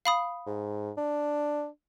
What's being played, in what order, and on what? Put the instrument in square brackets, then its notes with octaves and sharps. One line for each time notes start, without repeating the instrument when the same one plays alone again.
[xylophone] F5 B5 D#6
[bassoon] G#2
D4